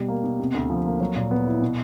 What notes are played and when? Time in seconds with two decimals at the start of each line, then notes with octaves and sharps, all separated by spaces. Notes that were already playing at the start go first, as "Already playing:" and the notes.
Already playing: B2 G3
0.08 A#3
0.24 B2
0.40 C3
0.54 D2
0.70 F3
0.85 A#3
1.00 F#3
1.16 A#2
1.31 B3
1.46 E4
1.62 B2